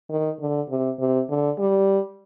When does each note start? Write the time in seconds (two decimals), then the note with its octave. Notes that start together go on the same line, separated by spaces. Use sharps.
0.10 D#3
0.40 D3
0.70 C3
0.99 C3
1.30 D3
1.59 G3